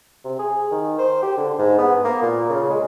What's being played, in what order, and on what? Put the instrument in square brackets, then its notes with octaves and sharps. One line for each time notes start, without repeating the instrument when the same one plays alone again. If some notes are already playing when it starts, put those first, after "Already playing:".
[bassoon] C3
G#4
D#3
C5
G4
D3
G#2
B3
A#3
A#2
C#3
G#3